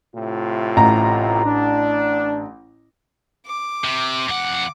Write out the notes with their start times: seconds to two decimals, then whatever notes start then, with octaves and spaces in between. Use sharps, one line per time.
0.14 A2 C3 F4
0.77 A1 A#5
1.44 D4
3.47 D6
3.84 C3
4.29 F2 F#5